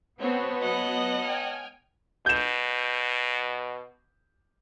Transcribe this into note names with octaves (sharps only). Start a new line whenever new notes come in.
B3 C4 F#4 C5 C#5 A5
F#3 D#5 F#5
G5 G#5 F6
B2 G6 E7